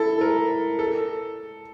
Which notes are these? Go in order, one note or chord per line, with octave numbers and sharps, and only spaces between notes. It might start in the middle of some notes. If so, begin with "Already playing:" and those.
Already playing: E4 A4
A#4
A4